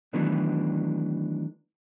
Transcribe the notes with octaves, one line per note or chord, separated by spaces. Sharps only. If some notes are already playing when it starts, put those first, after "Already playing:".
D#3 E3 F#3 A3 B3 D4